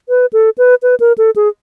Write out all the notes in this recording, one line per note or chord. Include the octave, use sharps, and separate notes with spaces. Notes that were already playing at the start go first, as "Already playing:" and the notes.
B4
A4
B4
B4
A#4
A4
G#4